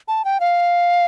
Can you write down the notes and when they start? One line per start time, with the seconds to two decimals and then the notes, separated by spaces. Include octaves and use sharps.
0.08 A5
0.25 G5
0.40 F5